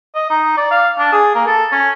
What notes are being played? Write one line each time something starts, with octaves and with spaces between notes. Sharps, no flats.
D#5
D#4
D5
F5
D4
G#4
A#3
A4
C#4